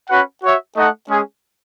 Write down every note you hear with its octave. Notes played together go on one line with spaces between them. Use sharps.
C#4 F#4 B4 F#5
F#4 C#5 E5
A3 D#4 A4 D#5 F#5
G#3 C#4 G#4